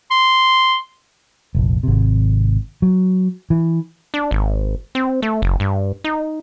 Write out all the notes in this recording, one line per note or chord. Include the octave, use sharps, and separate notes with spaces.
C6
F1 A#1
G#1 C3
F#3
E3
D4
G#1
C4
A3
F#1
G2
D#4